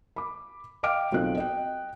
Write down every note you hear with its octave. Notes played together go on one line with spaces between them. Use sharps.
B5 D6
D#5 F5 G5 D6 F6 D7
B1 C4 F4 A4 D#5 F#6
D#5 G5